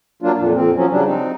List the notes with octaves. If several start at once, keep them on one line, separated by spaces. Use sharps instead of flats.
F#3 A#3 D4 F4
F2 A#2
F2 C4
F3 F#3 C#4
C#3 F#3 G3 D4
C4 D#4